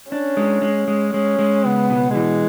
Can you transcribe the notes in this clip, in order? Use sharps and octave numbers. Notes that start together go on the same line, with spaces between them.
C#4 D4
G#3
G#3
G#3
G#3 C#4
G#3
C#2 B3
B2
E3 G#3